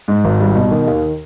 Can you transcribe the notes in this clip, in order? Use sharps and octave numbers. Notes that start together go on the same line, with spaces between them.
G#2
G#1
G3
B2
D#3
D#2